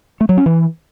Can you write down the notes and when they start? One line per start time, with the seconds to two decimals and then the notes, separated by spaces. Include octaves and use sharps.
0.21 A3
0.29 F#3
0.37 C#4
0.46 E3